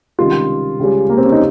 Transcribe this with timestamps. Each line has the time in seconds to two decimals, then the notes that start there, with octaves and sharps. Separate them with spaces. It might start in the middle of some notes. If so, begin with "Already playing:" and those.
0.18 C#2 C3 D#3 G3 F4
0.79 C#2 C#3 G3
1.10 A#3
1.17 C4
1.25 C#4
1.32 D#4